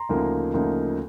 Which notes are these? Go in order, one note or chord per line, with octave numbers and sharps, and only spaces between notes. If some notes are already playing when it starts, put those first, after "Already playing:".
Already playing: A#5 C6
D2 C#3 F3 A#3 D#4
D2 C#3 F3 A#3 D#4